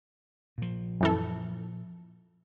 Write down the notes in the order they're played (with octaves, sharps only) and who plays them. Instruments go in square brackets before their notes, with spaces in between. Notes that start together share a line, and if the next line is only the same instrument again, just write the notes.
[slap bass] A#2 F3
[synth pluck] F#2 E3 A4